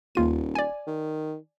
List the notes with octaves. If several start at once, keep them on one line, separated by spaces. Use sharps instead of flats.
D#1 D#2 F4 D#7
D5 G#5
D#3